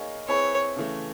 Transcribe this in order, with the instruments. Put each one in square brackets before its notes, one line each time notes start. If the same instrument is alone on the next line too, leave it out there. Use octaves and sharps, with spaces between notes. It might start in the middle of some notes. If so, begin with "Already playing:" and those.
Already playing: [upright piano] A#3 D#4 G#4 C#5 F5
[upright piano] C4 E4 G#4 B4 [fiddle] C#5
[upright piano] C#3 E3 A3